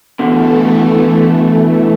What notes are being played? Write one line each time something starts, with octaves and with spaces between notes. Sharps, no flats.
B2 D3 E3 A3